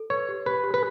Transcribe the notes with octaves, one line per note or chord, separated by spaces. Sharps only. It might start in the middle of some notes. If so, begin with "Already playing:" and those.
Already playing: A4
B4 C#5
G4
G4 B4
G4
B4